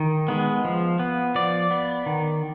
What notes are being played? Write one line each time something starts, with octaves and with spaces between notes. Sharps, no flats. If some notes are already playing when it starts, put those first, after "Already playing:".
Already playing: D#3
G#3 B3
F3
B3
F3 D5
B3
D#3